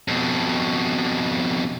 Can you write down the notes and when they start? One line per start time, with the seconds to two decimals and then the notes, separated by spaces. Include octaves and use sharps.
0.08 F2 B2